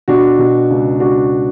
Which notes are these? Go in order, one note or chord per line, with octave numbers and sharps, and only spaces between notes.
B2 D4 F#4
B2
C#2
C#2 D4 F#4